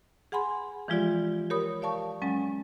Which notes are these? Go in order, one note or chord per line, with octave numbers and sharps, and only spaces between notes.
G#4 F#5 G#5 B5 C6
E3 F3 G#3 F4 G4 D5
G4 A#4 C#5 B5 D#6
D5 F5 A5 C#6
F#3 G#3 C#4